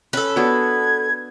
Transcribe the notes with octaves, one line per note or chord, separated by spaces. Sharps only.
C#4 A4 B4
B3 D4 F#4 G#6